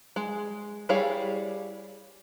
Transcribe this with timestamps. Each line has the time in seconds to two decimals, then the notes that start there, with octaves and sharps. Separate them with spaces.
0.16 G#3
0.89 G3 E4 G#4 C#5 F5